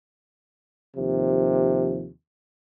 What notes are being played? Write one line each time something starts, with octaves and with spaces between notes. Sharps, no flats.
D#2 C3 F3